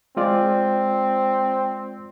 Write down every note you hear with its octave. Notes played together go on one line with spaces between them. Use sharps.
G#3 C4 F4 D5